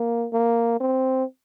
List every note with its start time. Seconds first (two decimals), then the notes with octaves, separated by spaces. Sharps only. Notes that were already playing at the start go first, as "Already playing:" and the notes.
Already playing: A#3
0.33 A#3
0.80 C4